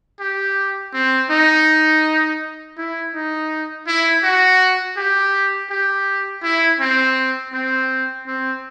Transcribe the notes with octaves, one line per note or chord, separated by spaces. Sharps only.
G4
C4
D#4
E4
D#4
E4
F#4
G4
G4
E4
C4
C4
C4